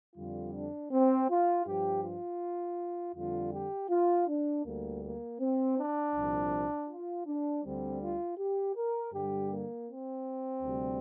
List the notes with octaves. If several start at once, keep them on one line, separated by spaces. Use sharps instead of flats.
F2 D3 G3 F4
D4
C4
F4
G2 F3 G4
F4
F2 D3 G3 F4
G4
F4
D4
D2 D3 G3 A#3
A#3
C4
D4
C2 A#2 F3
F4
D4
D2 D3 G3 C4
F4
G4
A#4
G2 D3 G3 G4
A#3
C4
D2 C3 G3